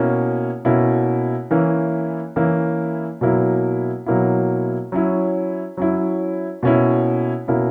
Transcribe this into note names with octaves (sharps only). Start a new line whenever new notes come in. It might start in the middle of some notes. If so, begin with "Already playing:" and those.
Already playing: B2 A#3 C#4 E4
B2 A#3 C#4 E4
E3 A#3 C#4 E4
E3 A#3 C#4 E4
B2 F#3 A#3 E4
B2 F#3 A#3 E4
F#3 C#4 E4
F#3 C#4 E4
B2 A#3 C#4 E4
B2 A#3 C#4 E4